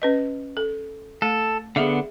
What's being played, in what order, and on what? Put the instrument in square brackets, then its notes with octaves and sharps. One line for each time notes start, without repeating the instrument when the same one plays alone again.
[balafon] C#4 B4 D#5
A4
[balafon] A3 [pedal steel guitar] A4
[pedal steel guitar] D3 B3 [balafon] G#4 E5 F5